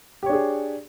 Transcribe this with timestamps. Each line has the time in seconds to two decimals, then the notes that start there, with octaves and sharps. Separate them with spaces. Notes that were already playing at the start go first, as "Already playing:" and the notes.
0.23 G4
0.26 C#5
0.30 D4
0.33 G#4